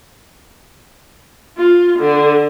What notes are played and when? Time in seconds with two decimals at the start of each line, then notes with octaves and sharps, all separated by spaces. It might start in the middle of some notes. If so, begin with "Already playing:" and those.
1.57 F4
1.99 D3